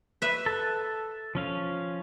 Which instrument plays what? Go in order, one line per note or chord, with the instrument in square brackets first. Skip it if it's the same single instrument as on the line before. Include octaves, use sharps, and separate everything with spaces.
[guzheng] B4 E5
[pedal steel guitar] A4 A5
F3 C#4 F5